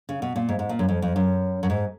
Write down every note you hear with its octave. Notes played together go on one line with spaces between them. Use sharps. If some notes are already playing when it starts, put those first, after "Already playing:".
C#3
B2
A#2
G#2
G#2
A#2
F#2
F2
F2
F#2
F#2
G#2